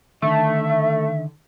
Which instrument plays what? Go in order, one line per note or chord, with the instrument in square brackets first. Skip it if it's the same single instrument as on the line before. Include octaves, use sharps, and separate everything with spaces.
[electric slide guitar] D3 D#3 [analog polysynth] A3 [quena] E5